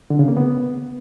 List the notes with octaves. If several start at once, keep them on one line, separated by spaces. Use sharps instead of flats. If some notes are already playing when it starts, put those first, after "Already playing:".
D3
C#3
A#3
B3